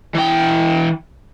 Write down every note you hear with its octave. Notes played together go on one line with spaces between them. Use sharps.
E3 G5